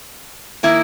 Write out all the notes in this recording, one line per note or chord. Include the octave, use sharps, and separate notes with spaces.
D#3 A#3 E4